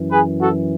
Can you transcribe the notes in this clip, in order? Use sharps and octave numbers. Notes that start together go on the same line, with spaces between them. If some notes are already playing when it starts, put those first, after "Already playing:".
Already playing: F#2 E3
G#4 B4
F#4 A4